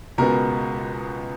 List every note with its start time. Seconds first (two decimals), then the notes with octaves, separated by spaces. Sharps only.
0.18 C#2 B2 G#3 B3 A#4